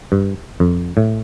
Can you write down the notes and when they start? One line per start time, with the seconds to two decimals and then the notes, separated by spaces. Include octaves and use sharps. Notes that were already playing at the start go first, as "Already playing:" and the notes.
0.12 G2
0.60 F2
0.97 A2